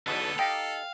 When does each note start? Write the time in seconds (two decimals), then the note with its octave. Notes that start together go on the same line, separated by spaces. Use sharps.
0.07 B1 E2 B2 D3 B3 A4
0.39 D#4 G4 F5 G5